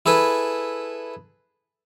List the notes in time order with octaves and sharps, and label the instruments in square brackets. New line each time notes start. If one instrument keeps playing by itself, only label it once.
[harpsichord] E4 G#4 A4 B4